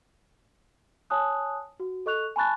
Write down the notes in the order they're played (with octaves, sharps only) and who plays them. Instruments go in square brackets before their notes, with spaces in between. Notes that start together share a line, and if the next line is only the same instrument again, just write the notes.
[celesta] C#5 G#5 A5 D#6 F#6
F#4
A4 D#5 C#6 F#6 F7
G#5 A5 B5 C#6 F#6 A6